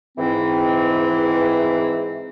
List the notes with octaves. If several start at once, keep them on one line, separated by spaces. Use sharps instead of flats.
G#2 E3 C4